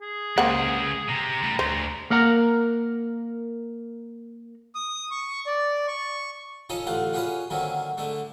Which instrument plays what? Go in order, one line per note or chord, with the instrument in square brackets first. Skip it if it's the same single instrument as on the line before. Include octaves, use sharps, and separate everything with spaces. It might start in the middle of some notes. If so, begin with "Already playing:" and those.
[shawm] G#4
[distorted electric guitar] C#2 [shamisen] A#3 C4 F#5
[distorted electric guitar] C3 [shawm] A#5
[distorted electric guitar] A2 G3
[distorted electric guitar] D2 [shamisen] C5
[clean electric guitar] A#3 A#4 F#5 A#5
[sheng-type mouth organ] D#6
C#6
D5
C#6
[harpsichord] C#4 D#4 F4 A4 C#5 D#5
A1 D3 F4 C5 F#5
C#4 F4 F#4 G#4 B4 C#5
D3 D#3 F#3 A#3 C4 C#4
D3 G#3 A3 D4